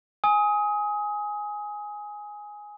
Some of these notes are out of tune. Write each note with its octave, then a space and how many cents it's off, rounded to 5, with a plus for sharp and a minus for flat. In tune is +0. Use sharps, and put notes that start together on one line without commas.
G#5 +0 D#6 +25